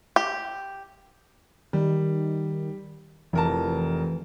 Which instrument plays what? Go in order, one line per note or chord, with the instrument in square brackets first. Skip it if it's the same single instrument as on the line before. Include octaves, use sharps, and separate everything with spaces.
[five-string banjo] G4
[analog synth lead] D#3 [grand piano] G3
[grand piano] F1 A#4 A5 [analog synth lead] E3